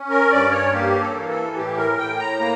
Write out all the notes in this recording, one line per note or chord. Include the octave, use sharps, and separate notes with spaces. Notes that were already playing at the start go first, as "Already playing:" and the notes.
Already playing: C#4
A#4
G2 D5
C#5
A#3 G4
A4
E3
A4
A2 G4
A#4
A2 G5
A#5
A#3